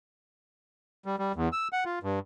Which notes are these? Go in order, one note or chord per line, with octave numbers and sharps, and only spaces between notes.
G3
G3
E2
E6
F#5
F4
G2